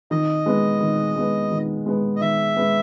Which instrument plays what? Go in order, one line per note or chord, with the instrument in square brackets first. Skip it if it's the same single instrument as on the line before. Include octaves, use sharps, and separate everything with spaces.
[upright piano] D#3 [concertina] D#5
[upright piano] G#3 B3
D#3
G#3 B3
D#3
G#3 B3
[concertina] D#5
[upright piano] D#3 [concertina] E5
[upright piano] G#3 B3